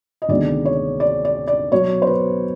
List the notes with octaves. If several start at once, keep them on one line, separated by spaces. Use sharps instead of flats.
D#5
D2 C3 D#3 G#3 B3 D5
C#5
D5
D5
D5
B2 F#3 B3 C#5
C5
B4